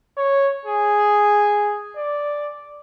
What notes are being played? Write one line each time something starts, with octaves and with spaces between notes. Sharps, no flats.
C#5
G#4
D5